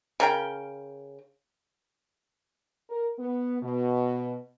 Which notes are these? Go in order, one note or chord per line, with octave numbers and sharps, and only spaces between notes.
C#3 A#4 G5
A#4
B3
B2